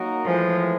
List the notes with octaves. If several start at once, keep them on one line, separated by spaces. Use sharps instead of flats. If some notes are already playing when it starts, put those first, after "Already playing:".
Already playing: F#3 A#3 D#4 F#4 A#4
A2 E3 F3 G#3